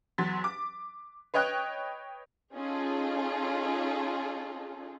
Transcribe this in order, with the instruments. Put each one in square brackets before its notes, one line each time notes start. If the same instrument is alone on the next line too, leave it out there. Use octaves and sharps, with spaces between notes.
[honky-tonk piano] E2 F#3 C6 A6 B6
D6
B4 C#5 D#5 G5 F#6
[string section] C#4 D#4 F4 G#4 A4